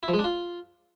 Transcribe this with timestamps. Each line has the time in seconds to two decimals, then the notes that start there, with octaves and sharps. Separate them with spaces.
0.03 E4
0.08 F3
0.14 G#3
0.19 D4
0.24 F4